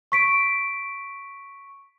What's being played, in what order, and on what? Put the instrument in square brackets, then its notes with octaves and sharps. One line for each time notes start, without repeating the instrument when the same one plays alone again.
[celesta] C#6 B6 D7